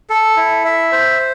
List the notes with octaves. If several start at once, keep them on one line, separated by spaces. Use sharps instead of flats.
A4
E4
E5
C5